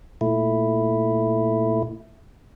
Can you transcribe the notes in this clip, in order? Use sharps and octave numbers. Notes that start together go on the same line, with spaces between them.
A#2 A3 E4